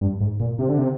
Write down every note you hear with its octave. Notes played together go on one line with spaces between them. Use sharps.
G2
G#2
A#2
C3
D3
C3